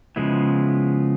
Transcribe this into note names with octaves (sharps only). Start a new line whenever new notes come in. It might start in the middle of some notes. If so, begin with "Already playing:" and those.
C#3 F3 G#3 B3 E4